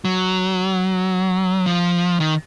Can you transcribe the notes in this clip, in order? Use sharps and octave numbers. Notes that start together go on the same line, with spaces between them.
F#3
F3
D#3